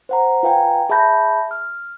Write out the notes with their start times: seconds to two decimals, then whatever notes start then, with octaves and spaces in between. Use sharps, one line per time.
0.09 C5 F#5 A#5
0.43 F4 B4 F5 G5 G#5 A#5
0.89 G#4 E5 A5 B5 G6 A#6
1.51 F6